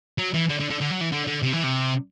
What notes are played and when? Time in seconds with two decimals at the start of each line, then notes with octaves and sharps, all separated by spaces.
0.18 F#3
0.34 E3
0.49 D3
0.60 D3
0.70 D3
0.81 D3
0.91 F#3
1.01 E3
1.12 D3
1.27 D3
1.43 C3
1.53 E3
1.63 C3